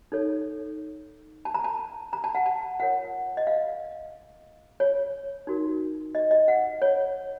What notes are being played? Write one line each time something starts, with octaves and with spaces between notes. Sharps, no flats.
D#4 A4 C#5
A5
A#5
A5
A#5
A5
F#5
A5
F4 A#4 C#5 F#5
D#5
F5
C#5
D#4 F#4 A#4
D#5
D#5
F#5
C#5